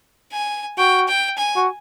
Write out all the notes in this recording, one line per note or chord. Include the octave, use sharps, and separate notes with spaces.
G#5
F#4 G5
G5
G#5
F#4